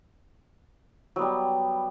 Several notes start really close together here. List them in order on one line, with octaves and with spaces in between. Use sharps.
F#3 B3 G3